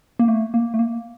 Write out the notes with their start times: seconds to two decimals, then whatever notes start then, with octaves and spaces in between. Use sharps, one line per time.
0.19 A#3
0.28 A3
0.54 A#3
0.74 A3
0.79 A#3